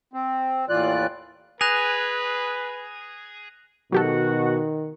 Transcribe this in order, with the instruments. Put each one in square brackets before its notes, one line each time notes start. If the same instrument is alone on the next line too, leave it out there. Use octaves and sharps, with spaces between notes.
[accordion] C4
D#2 A2 E3 F4 D5 F#6
[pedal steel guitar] G#4 [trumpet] B4 [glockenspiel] F#6 A#6 F7
[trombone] B2 [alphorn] D#3 [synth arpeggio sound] F#3 G4 A4 [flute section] F#4